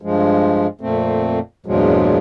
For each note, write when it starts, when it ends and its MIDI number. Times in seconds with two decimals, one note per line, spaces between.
0.02 0.67 43
0.02 0.67 53
0.02 0.67 56
0.81 1.39 41
0.81 1.39 46
0.81 1.39 57
0.81 1.39 60
1.66 2.18 40
1.66 2.18 43
1.66 2.18 46
1.66 2.18 53
1.66 2.18 54
1.66 2.18 56